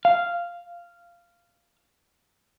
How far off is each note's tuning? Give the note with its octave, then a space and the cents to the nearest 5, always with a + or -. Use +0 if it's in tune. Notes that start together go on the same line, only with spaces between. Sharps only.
F5 -10